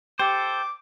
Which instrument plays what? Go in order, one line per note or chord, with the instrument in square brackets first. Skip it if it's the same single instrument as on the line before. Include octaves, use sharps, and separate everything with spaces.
[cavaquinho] G4 [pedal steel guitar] A4 C5 [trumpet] D6